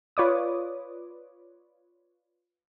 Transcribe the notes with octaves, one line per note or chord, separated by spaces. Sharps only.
F4 B4 C#5 D5 D6 D#6